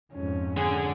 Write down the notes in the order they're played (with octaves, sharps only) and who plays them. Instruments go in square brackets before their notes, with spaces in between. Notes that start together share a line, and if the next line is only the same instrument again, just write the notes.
[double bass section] F2 G#2 [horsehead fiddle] C#4
[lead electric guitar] D3 [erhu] G#4